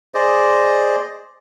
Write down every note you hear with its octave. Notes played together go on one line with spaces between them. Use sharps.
G#4 C5 D5 D#5